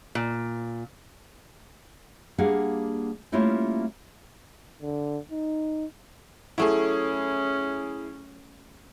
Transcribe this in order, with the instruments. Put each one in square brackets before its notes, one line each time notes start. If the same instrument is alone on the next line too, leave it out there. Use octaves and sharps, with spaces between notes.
[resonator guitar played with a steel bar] A#2
[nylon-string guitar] G3 A#3 D4 G#4 F5 F#5
G3 A3 A#3 C#4 E4 F4
[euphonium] D3
D#4
[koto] F#3 A3 [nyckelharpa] C#4 [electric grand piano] E4 G#4